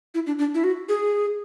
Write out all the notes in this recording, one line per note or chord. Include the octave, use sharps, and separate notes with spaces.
E4
D4
D4
E4
F#4
G#4